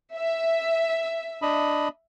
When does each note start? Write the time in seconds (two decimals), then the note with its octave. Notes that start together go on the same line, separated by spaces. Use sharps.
0.15 E5
1.42 D4 D#5 B5